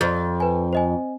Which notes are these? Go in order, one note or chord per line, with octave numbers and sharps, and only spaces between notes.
F2 A6
B4 G#5
C5 D#5 G#5